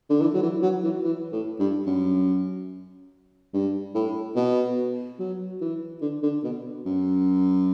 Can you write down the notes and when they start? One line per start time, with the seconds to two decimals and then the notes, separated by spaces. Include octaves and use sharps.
0.10 D3
0.21 E3
0.34 F#3
0.42 E3
0.62 F#3
0.83 E3
1.04 E3
1.32 A2
1.59 G2
1.86 F#2
3.54 G2
3.95 A2
4.35 B2
5.19 F#3
5.61 E3
6.01 D3
6.23 D3
6.43 B2
6.86 F#2